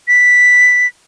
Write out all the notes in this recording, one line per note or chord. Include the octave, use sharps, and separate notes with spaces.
B6